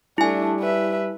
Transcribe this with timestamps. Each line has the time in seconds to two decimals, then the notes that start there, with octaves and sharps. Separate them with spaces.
0.18 G3 A3 D4 E4 G#5
0.60 B4 E5